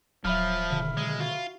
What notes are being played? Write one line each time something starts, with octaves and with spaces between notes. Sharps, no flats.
D1 F3 F#3 E5 B5 F6
B2 D3 D#3
F#3 G#3
F4 F#4